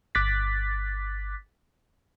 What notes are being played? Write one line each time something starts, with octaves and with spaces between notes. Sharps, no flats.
G1 D6 F#6 A6 B6